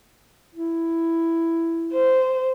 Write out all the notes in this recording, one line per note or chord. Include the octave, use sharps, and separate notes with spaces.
E4
C5